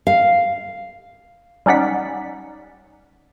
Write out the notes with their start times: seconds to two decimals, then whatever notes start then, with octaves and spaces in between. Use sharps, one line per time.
0.07 F5
1.66 G3 C#4 D#4 D5 F#5 B6